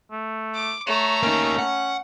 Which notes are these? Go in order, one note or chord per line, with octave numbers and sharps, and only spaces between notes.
A3
D6
A3 C#5 A#5
A#3 C#4 D#4
F#5